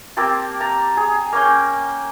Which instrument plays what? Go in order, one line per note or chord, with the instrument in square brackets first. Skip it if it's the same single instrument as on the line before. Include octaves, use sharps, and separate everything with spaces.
[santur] A#3 C4 G4 A5
A5 A#5
G#4
A#3 C#4 G5